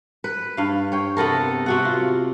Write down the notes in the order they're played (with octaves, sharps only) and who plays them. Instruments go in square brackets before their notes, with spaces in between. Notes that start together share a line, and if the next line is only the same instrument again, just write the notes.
[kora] B4
G2 F5
C#5 G5
C3 B3 A4 A#4
C3 F#4 F#5
F4